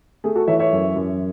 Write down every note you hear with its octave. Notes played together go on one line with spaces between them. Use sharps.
A3 G#4
F#4 A4
E3 C#5 E5
C#5 E5
F#2
F#2